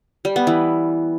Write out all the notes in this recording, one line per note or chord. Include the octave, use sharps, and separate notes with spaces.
G3
B3
E3